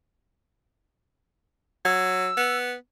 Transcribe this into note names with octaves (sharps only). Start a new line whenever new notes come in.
F#3 E6
B3